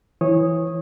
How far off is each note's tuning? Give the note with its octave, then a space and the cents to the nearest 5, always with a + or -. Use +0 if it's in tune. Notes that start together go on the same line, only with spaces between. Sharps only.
E3 +0 C#5 -20 D#6 +0